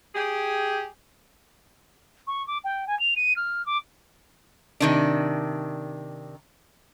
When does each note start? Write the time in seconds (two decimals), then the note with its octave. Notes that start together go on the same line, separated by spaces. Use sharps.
0.15 G4 G#4
2.27 C#6
2.47 D6
2.64 G5
2.87 G#5
2.99 F7
3.16 D#7
3.36 F6
3.66 D6
4.80 C3 D#3 D4